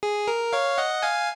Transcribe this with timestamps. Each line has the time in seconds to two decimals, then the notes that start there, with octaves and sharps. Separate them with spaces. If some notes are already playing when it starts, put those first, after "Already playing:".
0.03 G#4
0.28 A#4
0.53 C#5 F5
0.78 D#5 F#5
1.02 F5 G#5